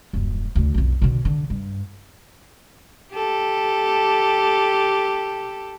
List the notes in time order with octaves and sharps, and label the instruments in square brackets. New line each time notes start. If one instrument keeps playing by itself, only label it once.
[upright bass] D#1 F#2
D2 D3
B1 F2
B2 D3
D3
G2
[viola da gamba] G4 A4